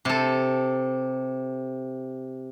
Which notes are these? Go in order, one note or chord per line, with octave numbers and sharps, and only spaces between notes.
C3 A4